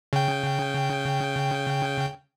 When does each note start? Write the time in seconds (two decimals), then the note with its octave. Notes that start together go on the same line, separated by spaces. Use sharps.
0.13 C#3 G5